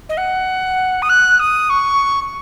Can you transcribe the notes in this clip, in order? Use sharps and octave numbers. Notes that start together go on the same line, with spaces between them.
D#5
F#5
D#6
F#6
D#6
C#6